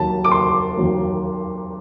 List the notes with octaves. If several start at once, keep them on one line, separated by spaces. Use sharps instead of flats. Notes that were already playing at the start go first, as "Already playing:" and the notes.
Already playing: D#2 D#3 F#3 A5
D6
C6
D#2 D#3 F#3